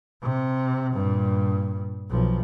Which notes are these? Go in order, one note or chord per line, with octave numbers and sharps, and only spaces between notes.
C3
G2 A#2
B1 F3